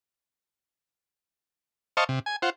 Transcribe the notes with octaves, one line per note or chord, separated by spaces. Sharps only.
C5 D#5 F5 A5 C#6
C3
G#5
F4 C5 F#5